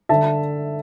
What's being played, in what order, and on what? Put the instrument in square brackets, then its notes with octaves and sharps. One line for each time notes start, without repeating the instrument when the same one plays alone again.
[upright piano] D3 E5 A5